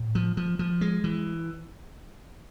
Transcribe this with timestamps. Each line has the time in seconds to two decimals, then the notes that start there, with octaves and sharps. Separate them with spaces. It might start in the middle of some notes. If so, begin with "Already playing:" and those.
Already playing: A2
0.15 F3
0.37 F3
0.59 F3
0.81 G#3
1.04 E3